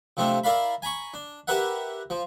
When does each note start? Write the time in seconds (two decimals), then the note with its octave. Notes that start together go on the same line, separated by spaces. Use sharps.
0.17 C3 F3 A3 C4 D4
0.44 E4 A#4 D5 F5 B5
0.82 G#5 A#5 B5 C#6
1.14 D4
1.48 G4 A#4 B4 E5 F#5
2.10 F3